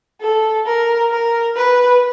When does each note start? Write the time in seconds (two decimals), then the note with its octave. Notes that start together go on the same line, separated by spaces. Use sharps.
0.21 A4
0.66 A#4
1.11 A#4
1.56 B4